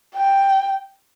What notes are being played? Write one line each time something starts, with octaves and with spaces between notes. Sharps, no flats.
G5